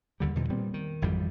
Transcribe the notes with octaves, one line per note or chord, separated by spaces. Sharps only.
D#2 D3 G3
E2 B2 D#3 F3
A#2 G3 B3 C4
D#3
G#1 F2 E3 G3